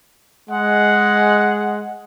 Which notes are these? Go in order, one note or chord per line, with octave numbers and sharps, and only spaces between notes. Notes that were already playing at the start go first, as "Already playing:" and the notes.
G#3 F#5